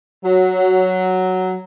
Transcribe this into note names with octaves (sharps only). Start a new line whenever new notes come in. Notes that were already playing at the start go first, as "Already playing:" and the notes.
F#3